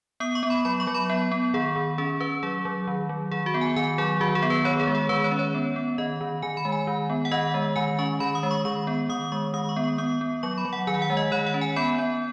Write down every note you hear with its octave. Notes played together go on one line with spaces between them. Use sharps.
B3 D#6
C#6
B3
B5
F#3 B5
C#6
F#3
B5
B3
B3
D#3 G#4
D#3
C#4 G#4
C#4 B4
F#3 G#4
F#3
D#3
F#3
D#3 G#4
F#4
B3
G#5
D#3 G#5
F#3 G#4
D#3 F#4
G#4
B3
B4
D#3 C#5
G#4
G#3
G#4
D#3 B4
C#5
C#4
C#5
B3
B3
D#3 D#5
D#3
D#3 G#5
B5
G#3
G#5
D#3
B3
F#5
D#3 D#5
G#3
D#3 G#5
C#4 C#6
D#3 B5
D#6
G#3
C#6
D#3 C#6
B3
D#3 D#6
G#3 C#6
D#3 D#6
C#6
B3
C#6
B3 D#6
B3
F#3 C#6
B5
F#3
F#5
D#3 G#5
F#5
G#3
D#5
D#3 C#5
F#5
C#4
G#5
B3 B5
B3